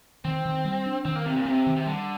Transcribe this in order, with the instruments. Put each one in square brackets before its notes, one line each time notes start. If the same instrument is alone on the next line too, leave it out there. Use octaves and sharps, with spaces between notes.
[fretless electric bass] D#3 [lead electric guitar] C4
[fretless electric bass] D#3
G3
D4
[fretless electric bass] D#3 [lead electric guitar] C4
[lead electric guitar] A#3
[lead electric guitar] C3 [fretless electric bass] C4
[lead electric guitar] A#2
[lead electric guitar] C3 [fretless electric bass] C4
[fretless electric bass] D#3
[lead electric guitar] C3
[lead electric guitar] D3 [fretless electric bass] G3